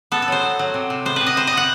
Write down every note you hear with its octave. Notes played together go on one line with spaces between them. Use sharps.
B3 A4
A4
F#3 C5
F#3
F#3
C3
C3
B3 C5
C3 B4
D#5
C3 C5
D#5
B3 F#5